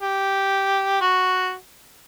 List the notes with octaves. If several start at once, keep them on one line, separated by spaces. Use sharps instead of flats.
G4
F#4